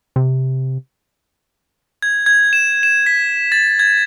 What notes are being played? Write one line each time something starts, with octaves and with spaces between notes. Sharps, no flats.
C3
G#6
G#6
E7
E7
B6
A6
G#6